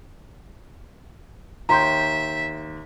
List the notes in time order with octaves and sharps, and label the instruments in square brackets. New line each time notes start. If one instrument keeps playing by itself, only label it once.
[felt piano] D#2 G5 G6 [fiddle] E5 [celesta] A#5 C6